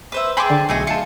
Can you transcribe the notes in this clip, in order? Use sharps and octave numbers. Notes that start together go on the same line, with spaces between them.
B4 C5 E5
G#4 G5 A5 B5 C6 D6
D3
B1 A3 G#4 D#5
F4 A5 C#7